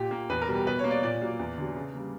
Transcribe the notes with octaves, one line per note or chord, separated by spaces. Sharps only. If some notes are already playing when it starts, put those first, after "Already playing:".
Already playing: A#2 G4
A#3
E2 B4
A#4
B2 G3
G4
B2 B4
C#5
A#3
D5
A#2 D5
F#3 A#3
E2
D3 F#3
C#3
G3 A#3